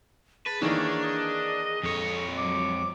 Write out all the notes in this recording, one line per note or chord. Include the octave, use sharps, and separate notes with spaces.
G#4 B4 A5
D#3 E3 A#3 D4 C#5
D#5
F2 A4 C#5
F#3 D6